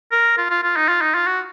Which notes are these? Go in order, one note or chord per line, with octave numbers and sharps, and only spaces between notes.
A#4
F4
F4
F4
D#4
F4
D#4
F4
F#4